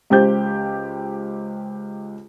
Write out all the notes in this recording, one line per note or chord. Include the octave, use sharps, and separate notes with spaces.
C#2 G4 C5 G6